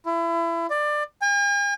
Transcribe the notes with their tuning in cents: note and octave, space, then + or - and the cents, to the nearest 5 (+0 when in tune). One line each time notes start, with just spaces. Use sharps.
E4 +30
D5 +20
G#5 -45